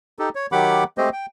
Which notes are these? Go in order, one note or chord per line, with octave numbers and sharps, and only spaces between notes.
D#4 G4 A4
C#5
D#3 F#3 G4 F#5 B5 D6
G#3 A3 C4 G4 C5 D#5
G5